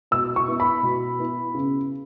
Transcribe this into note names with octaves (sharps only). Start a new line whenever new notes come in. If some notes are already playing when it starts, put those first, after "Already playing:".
B2 E6
C#6
B3 E4
B5
B2
B3 E4
C#3